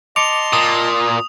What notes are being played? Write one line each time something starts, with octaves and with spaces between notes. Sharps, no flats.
D#5 A5 C6 D6 C#7 F7
A#2 D#6